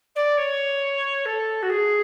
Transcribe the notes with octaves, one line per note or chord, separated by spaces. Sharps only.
D5
C#5
A4
F#4
G#4